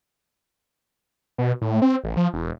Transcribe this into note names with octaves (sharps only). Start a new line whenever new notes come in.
B2
A2
C4
A1
F3
E1